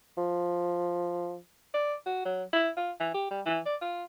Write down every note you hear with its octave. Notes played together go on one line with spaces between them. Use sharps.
F3
D5
F#4
F#3
E4
F4
E3
G4
G3
E3
D5
F4